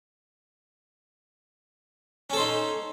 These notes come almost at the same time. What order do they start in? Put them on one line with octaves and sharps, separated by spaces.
C#4 A4 C5 D#4